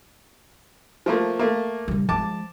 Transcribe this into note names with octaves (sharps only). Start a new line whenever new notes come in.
F3 A3 A#3
A3 A#3
C#3 G3
F3 G#3 A5 D6